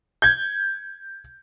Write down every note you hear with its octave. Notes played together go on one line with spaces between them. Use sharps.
G6 G#6